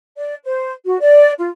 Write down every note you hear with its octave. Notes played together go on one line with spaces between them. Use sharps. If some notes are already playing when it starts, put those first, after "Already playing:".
D5
C5
F#4
D5
F4